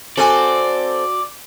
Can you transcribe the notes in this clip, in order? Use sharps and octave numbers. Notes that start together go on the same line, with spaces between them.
C4 F#4 A4 D5 G#5